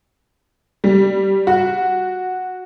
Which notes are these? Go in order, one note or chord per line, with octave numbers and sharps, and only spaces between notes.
G3
F#4